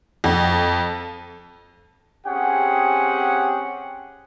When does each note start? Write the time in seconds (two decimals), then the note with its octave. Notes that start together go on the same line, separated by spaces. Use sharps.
0.24 F2
2.27 C4 C#4 G4 G#4 F#5 G5